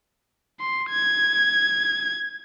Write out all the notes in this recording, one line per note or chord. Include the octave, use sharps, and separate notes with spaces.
C6
G#6